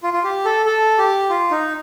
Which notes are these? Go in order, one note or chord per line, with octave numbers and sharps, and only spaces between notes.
F4
F4
G4
A4
A4
G4
F4
D#4